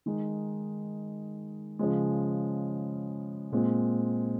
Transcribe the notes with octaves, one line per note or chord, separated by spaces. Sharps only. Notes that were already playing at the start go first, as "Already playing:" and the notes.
D#3 G#3 D#4
C#3 F3 G#3
A#2 G#3 C4